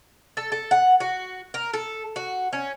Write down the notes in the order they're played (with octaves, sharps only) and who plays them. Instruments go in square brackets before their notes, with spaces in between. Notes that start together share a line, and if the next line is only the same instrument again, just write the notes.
[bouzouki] A4
A4
F#5
F#4
A#4
A4
F#4
C#4